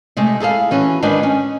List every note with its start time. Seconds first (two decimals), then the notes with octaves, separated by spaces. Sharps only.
0.17 C3 G#3 A3
0.40 E4 G#4 A4 F5
0.71 E3 C#4 F#4
1.02 G#2 D#3 D4 B4 D#5 G#5
1.23 C#4